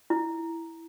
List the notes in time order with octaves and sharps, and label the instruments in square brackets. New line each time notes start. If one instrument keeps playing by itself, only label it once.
[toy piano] E4